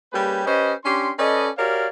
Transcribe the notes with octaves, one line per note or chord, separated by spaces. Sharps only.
G3 A#3 C#4 G4 G#4 B4
C#4 G4 B4 C5 D#5
C#4 D4 G4 C6
C#4 A4 B4 D5 D#5
F#4 G4 A#4 C#5 D5 F5